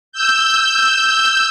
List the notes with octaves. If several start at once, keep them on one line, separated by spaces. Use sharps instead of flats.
E6 G6